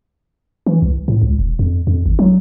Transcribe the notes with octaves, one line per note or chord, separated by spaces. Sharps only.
E3
C2
A2
C#2
E1
F2
F2
G#1
F#3